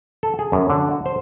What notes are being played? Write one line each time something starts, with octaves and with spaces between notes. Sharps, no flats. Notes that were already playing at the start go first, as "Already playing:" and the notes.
A4
G#4
F#2
D3
F#4
C5